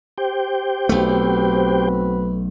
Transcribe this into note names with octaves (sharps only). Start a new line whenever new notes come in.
G4 C5 G5
B1 A3 C4 F#4 B4